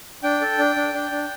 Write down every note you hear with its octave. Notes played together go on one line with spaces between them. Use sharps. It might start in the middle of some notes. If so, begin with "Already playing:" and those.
D4 G5
A4
D4
D4
D4
D4